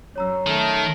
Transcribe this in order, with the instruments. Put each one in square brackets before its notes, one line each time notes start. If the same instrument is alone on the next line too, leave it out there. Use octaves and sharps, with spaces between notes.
[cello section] F#2 [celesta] C#5 A#5 E6
[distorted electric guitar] D#3 [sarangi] A3